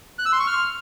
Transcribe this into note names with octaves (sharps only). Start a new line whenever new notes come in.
F#6
E6
C6
C#6
F6